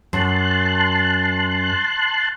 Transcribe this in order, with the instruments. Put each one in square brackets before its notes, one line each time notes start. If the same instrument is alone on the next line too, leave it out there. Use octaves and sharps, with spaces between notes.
[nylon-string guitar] F#2 [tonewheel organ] A5 C6 F#6